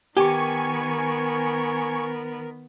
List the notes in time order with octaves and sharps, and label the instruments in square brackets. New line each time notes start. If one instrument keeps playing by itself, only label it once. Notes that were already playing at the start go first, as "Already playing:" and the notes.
[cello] D#3 B3 [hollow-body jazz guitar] G4 [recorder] A#4 [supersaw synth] G#5 C#6